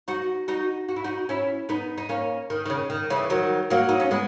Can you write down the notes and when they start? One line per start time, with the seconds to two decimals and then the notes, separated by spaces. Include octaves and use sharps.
0.08 D#4 F#4
0.48 D#4 F#4
0.89 F#4
0.96 E4
1.04 D#4 F#4
1.29 C#4 E4
1.69 B3 D#4
1.98 D#4
2.09 A#3 C#4
2.50 D#3
2.65 D#3
2.70 C#3
2.90 D#3
3.10 C#3 E3
3.30 D#3 F#3
3.70 F#3 A#3
3.89 D#4
4.00 C#4
4.11 G#3 B3